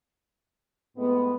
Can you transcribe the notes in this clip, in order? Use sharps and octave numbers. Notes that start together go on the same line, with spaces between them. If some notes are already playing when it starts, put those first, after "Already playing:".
A2 G#3 B3